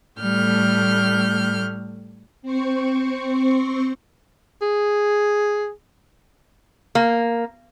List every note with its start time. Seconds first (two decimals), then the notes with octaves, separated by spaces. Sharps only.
0.19 A2 G3 A3 F6 G6
2.42 C4 C5 C#6
4.62 G#4
6.95 A#3